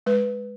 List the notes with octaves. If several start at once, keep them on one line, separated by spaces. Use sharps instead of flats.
G#3 B4